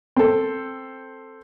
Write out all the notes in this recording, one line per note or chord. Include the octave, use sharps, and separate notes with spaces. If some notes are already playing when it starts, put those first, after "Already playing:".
C4 A4